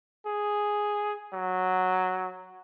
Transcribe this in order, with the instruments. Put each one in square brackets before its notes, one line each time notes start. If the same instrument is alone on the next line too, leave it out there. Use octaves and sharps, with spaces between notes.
[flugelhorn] G#4
F#3